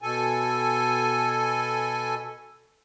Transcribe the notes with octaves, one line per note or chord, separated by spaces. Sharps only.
B2 A4 G#5